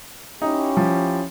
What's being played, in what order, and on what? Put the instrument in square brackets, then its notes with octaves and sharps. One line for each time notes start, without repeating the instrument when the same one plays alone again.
[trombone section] C#4 E4 G4 [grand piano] D#4
[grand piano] F3